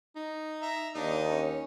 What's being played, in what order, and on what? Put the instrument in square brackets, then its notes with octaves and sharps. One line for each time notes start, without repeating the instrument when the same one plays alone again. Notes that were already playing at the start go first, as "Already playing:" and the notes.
[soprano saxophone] D#4
[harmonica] E5 A#5
[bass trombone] D#2 [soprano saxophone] D4 [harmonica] D#4
[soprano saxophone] C#4